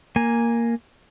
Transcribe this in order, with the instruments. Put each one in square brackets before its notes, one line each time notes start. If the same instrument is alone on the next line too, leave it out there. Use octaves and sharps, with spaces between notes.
[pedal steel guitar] A#3 G#5